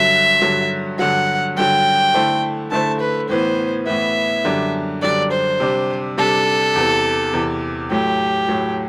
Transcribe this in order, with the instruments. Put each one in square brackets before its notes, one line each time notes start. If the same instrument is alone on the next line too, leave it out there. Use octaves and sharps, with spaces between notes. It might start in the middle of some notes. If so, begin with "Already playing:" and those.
Already playing: [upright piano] G2 D3 F#3 [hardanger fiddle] E5
[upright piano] G2 D3 F#3
[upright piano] G2 D3 F#3 [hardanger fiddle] F#5
[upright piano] G2 D3 F#3 [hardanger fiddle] G5
[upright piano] D3 A3 E4 A4 C5
[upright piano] D3 A3 E4 A4 C5 [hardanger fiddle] A5
[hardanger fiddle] B4
[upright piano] A2 E3 B3 [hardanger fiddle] C5
[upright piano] A2 E3 B3 [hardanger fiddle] E5
[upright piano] F#2 D3 G3 D4
[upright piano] F#2 D3 G3 D4 [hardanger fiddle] D5
[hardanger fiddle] C5
[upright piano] C3 G3 D4
[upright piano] C3 G3 D4 [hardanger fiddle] A4
[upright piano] E2 C3 E3
E2 C3 E3
[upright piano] A2 F#3 A3 [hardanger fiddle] G4
[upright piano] A2 F#3 A3